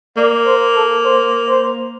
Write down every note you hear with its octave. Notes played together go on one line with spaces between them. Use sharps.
A#3 D5
C5
A4
C5
C5